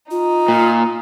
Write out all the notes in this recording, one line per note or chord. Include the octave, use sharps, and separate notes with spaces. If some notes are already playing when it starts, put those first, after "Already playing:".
D#4 F4
A#2